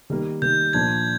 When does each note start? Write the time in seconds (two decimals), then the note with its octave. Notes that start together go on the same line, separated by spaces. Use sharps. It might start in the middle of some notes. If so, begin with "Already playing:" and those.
0.10 D#3 G3 A#3
0.42 D#3 G3 A#3 G6
0.73 A#2 F3 A#3 D4 G#6